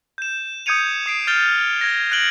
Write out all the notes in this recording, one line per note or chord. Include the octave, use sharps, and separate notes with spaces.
G6 E7
D#6 G6 G#6 C#7 D#7 F7
D#6 C7 D7
F6 G6 A6 F7 G7
G#6 A#6
F#6 G#6 A#6 D7 F#7 G7